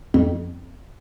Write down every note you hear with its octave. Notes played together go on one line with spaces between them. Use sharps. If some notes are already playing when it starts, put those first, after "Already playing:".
F2